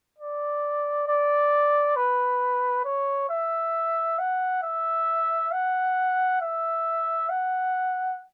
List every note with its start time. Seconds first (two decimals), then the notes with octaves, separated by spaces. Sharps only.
0.18 D5
1.08 D5
1.96 B4
2.85 C#5
3.30 E5
4.19 F#5
4.63 E5
5.52 F#5
6.41 E5
7.30 F#5